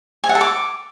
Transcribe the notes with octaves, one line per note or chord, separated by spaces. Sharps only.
G#5
F#5
A4
D6